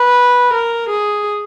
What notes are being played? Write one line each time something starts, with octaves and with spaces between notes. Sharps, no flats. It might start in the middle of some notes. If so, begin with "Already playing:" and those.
Already playing: B4
A#4
G#4